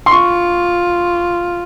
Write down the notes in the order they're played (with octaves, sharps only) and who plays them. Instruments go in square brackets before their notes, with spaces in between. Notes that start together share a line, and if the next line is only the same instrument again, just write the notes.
[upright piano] C6
[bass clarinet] F4 [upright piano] C#6